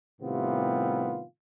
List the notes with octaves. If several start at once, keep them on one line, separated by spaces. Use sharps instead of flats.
A2 C3 D#3 G3 B3 F4